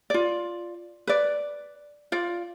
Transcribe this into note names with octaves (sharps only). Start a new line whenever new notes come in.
F4 D5
B4 D5
F4 D5